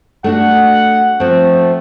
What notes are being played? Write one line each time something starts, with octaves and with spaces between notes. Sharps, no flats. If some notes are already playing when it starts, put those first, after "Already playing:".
A3 D4 F#4 F#5
F3 A3 C4